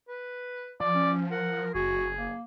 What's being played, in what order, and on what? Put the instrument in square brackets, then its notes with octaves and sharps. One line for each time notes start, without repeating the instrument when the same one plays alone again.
[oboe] B4
[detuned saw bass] F3 [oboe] D5
[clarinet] C#4
[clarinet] A#4 [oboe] F#5
[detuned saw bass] F#1 [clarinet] F#4 [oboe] G#4
[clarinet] A#3